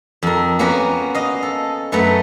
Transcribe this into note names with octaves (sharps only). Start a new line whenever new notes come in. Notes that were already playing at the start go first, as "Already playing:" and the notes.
F2 A#4
A#3 B3 C#4 F#4 A#4
D#5 F5
A4
F#2 A3 B3 B4 A#5